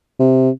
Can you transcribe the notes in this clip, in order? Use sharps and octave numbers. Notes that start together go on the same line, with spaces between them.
C3